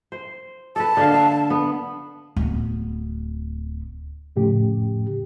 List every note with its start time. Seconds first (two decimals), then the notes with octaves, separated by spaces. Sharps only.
0.12 C5
0.76 A4 B4 A5
0.97 D3 A#3 F5
1.14 E5
1.50 B3
2.36 D1 B3
4.36 F2 A2 C#3 G4